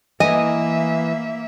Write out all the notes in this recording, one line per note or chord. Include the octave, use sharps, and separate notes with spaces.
E3 A#3 D#5 E5 G#5